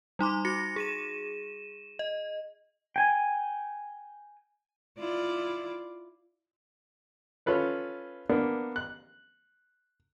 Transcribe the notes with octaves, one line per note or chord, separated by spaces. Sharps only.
G3 D#4 C6 D6
F#4 A#6 C#7
G#4 D#7 E7
D#5
G5 G#5
E4 F4 D5
C#4 F4 A4 B4 C#5
A#3 B3 D4
F#6